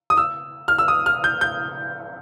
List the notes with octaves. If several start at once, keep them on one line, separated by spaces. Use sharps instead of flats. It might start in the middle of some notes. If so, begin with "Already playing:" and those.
D#6
E6
F6
E6
D#6
F6
G6
G6